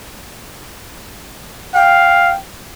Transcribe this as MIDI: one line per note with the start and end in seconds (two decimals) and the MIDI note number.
1.74 2.34 77
1.74 2.35 79